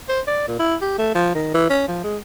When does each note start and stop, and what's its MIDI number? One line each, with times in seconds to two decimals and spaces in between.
0.09 0.21 72
0.27 0.44 74
0.48 0.56 46
0.59 0.76 64
0.81 0.97 67
0.98 1.11 57
1.15 1.30 53
1.35 1.54 51
1.54 1.69 52
1.70 1.84 61
1.88 2.01 53
2.04 2.17 56